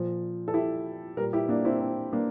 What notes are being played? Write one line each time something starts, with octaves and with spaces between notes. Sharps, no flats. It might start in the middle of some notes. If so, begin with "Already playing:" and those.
Already playing: A#2 F3
A4
E4 G4
A#2 G3 G4 A#4
E4 G4
A#3 D4
C4 E4
C4
A#3 D4